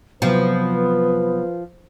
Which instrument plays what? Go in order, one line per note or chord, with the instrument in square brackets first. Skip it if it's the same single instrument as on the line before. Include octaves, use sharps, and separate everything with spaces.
[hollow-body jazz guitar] C3 F#3 [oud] F3 [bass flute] B3 [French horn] B4